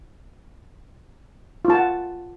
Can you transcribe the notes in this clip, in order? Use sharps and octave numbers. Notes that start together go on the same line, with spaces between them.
F4
A5
F#5